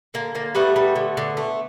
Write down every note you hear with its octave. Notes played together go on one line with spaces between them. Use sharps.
D3 A#3
D3 A#3
G3 A3 B3
G3
D3
D3
A3